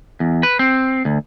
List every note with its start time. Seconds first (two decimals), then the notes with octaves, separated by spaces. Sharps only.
0.20 E2
0.43 B4
0.59 C4
1.05 D2